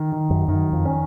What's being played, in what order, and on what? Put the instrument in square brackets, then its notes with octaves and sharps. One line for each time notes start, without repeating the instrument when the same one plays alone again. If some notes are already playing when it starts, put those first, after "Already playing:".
Already playing: [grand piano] D#3
D#3
[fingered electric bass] F#2
[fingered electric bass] F#2 [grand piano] D#3
[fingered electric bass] F2
[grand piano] C#4